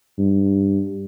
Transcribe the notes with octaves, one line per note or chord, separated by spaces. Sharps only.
G2